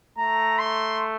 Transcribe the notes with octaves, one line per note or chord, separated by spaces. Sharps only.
A3 A#5
C6